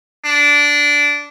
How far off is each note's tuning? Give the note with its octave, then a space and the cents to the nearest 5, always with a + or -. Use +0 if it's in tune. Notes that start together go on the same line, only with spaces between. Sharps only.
D4 -15